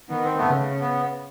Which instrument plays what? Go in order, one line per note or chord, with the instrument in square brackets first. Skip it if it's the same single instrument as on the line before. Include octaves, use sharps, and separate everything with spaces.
[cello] D#3 [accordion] B3
[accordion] C4
A3 B3
[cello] C#3
[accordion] B3